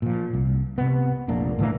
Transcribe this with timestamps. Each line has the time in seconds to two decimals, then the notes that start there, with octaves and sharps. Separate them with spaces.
0.02 A#2 F3
0.33 C2
0.78 C3 B3
1.28 F1 A#1 A#3 D4
1.59 A2 D3 E3 A#3